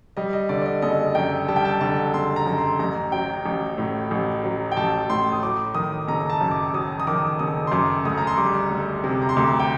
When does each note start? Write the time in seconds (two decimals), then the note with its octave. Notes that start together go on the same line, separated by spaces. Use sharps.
0.17 G3 D#5
0.33 D#5
0.49 D3 D5
0.62 D5
0.66 D#5
0.82 F#1 D#5
1.15 F#2 G5
1.48 G3 A5
1.56 G5
1.65 A5
1.81 D3 A5
2.14 F#1 C6
2.36 A#5
2.46 F#2
2.58 C6
2.79 A1 A#5
3.12 F#3 G5
3.46 A1
3.78 A2
4.11 A1
4.44 F#3
4.72 G5
4.77 A1 A5
5.09 A2 C6
5.32 D#6
5.43 F#3 D6
5.75 D#3 D#6
6.08 F#1 A#5
6.30 A5
6.41 F#2
6.51 D6
6.74 F#3 D#6
7.00 D#6
7.07 D#3 D6
7.39 F#1 D#6
7.67 C6
7.72 F#2 D6
8.05 D2 D#6
8.18 A#5
8.27 C6
8.38 G3 D6
8.70 D2
9.04 C3
9.22 A#5
9.29 C6
9.36 D2 D6
9.59 G5